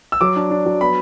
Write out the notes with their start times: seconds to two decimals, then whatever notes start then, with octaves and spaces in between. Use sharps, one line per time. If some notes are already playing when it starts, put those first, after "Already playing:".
0.12 E6
0.21 F#3 D6
0.36 D4
0.51 D4
0.66 F#3
0.81 B3 B5